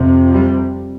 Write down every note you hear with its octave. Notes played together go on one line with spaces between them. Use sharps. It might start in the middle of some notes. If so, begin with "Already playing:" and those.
Already playing: F2 C3
G3